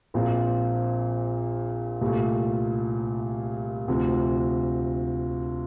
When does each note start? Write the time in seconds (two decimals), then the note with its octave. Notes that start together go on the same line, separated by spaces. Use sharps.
0.14 A#1 A#2 F3 C4
2.01 C2 A#2 A3
3.88 D2 C3 F3